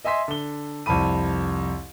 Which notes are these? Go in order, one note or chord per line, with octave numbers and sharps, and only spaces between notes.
D#5 E5 G#5 C6 B6
D3 G7
C2 F2 A5 B5 D#7